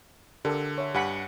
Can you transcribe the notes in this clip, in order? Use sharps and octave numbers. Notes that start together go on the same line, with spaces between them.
D3 G4 A4 A#4
C#5 E5
G2 G4 F#5 G#5 B5 C#7